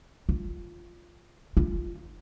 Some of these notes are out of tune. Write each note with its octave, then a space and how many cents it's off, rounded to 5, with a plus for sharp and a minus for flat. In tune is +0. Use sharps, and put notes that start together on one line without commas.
F4 -5
F4 -15